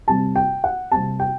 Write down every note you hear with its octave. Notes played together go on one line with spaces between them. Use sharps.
C3 G3 C4 A5
G5
F#5
C3 G3 C4 A5
G5